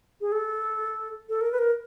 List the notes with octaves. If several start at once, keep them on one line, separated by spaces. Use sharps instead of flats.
G#4
A4
A4
A#4
B4
A#4